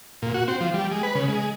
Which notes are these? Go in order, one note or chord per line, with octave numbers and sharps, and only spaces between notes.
A#2
F#4
C4
F3
G3
G#3
B4
C#3
G#3